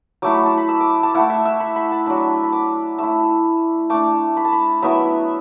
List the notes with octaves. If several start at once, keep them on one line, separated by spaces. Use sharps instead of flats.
F#3 A3 E4 D6
B5
A5
B5
E6
D6
A5
A3 E4 F#5
E5
E5
B5
B5
A5
F#3 D4 B5
B5
D6
A3 E4 E6
A3 D4 D6
B5
A5
B5
F#3 B3 E4 E5